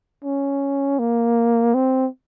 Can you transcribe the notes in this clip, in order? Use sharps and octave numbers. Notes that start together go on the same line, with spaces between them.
C#4
A#3
C4